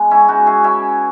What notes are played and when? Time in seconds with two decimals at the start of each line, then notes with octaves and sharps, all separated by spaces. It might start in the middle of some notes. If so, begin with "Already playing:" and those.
Already playing: G#3 B3
0.11 C#4 E4
0.28 G#3 D#4 F#4
0.46 E4 G#4
0.64 B2 C#4 E4